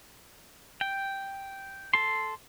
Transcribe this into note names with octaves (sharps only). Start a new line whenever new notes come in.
G5
A4 C6